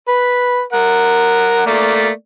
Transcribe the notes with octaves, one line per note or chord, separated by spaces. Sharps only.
B4
A#4 F#5
A3 A#3 D5